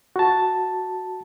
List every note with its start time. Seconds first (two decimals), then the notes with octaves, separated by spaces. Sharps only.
0.16 F#4 A5